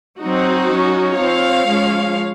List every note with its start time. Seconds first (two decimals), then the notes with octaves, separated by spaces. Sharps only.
0.21 F#3 C4 D#4 F#4
0.69 F#3 C#4
1.18 F3 C4 C#5 F5
1.66 F3 G#3 C#4